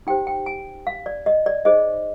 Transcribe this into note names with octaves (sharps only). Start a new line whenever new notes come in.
D#4 G4 C5 G5
G5
G#5
F5
D5
D#5
D5
D#4 G#4 C5 D#5